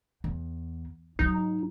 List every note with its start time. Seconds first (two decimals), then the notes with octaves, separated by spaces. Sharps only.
0.24 E2
1.19 G#2 F#3 D#4